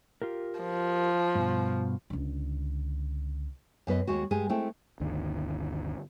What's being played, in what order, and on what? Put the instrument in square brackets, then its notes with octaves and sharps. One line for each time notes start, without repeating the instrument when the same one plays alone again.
[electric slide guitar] F4 G4 A#4
[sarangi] F3
[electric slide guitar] G2 B2
[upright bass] C#2 D3
[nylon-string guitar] F#2 B3 B4 D#5
D#2 G#3 F#4
G2 G#3 G4 G#4 G#5
G#3 A3 C4 E4 G#4 G5
[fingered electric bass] G1 D2 D3 D#3